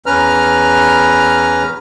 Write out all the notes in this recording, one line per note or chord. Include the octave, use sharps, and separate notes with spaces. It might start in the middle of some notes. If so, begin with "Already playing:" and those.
E2 C#4 B4 A#5 F6